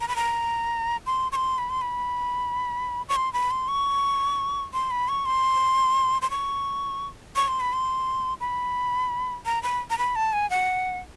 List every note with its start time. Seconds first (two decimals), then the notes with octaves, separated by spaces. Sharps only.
0.01 A#5
0.08 B5
0.16 A#5
1.06 C6
1.32 C#6
1.36 C6
1.58 B5
1.70 C6
1.81 B5
3.09 C#6
3.16 C6
3.33 B5
3.51 C6
3.68 C#6
4.73 C6
4.91 B5
5.09 C#6
5.25 C6
6.22 C6
6.30 C#6
7.36 C#6
7.48 C6
7.60 B5
7.73 C6
8.40 B5
9.46 A#5
9.63 B5
9.90 A#5
9.98 B5
10.16 A5
10.33 G#5
10.50 F#5